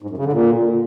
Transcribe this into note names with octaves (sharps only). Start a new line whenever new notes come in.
G#2
F#2
C#3
D3
A#2